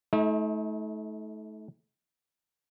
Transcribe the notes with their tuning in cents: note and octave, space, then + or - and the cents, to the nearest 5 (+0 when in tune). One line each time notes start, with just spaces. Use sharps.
A3 -30 D#4 +40